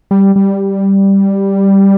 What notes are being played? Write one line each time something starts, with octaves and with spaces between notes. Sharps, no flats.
G3
G3